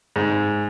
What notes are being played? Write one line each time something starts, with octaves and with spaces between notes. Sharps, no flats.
G#2